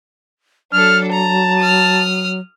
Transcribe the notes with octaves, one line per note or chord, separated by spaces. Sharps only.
F#3 D4 A4 F6
A5 A#5
D#6 F6